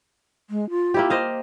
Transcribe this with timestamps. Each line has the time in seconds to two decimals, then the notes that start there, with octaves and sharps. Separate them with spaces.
0.50 G#3
0.70 F4
0.94 A#3 E4 G4
1.10 C5 D#5 F5